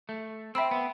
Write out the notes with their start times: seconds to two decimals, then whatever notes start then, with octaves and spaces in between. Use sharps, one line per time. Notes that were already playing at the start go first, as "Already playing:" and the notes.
0.09 A3
0.55 C4 E5 G5 B5 E6
0.71 B3